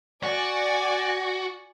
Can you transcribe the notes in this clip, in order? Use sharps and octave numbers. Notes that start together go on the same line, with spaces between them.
F#4 D5 G#5